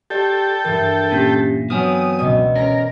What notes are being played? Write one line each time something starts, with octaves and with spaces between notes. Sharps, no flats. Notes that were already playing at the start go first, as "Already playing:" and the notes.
G4 A4 D5 G5
G2 E3 A#4
A#2 C#4 G4
F#3 B3 C4 C#5 G#5 D#6 F6
C#2 B2 D5 D#5
C#4 A#4 A#6 D7